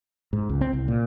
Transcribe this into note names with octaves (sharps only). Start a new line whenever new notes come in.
G#2
C#2
C4
C2
A#2